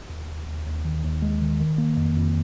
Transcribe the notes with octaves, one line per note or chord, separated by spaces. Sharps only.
D#2
D#2
D#2
D#2
D#3
D#2
G#3
D#3
D#3
A#3
F2
F2